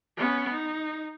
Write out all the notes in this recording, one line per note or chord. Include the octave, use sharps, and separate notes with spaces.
B3 C#4
D#4